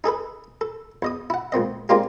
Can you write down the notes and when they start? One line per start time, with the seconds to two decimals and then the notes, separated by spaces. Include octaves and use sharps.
0.04 D#4 G#4 A4 B4
0.61 A4
1.02 E2 D#5 D#6
1.30 E4 F#5
1.52 C#2 A#2 C4 D#5
1.89 G#3 A#3 C4 D4 F4 G4